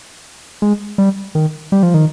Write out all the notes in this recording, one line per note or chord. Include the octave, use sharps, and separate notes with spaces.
G#3
G3
D#3
G3
F3
D#3